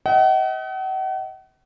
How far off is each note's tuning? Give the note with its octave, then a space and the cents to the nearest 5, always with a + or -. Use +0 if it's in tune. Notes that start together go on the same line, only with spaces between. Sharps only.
D#5 +40 F#5 +40